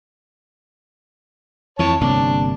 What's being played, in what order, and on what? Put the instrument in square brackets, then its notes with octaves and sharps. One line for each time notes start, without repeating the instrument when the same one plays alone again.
[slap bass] F2 E3 [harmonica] C#5 A5
[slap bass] G1 C3 A#3 [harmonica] D4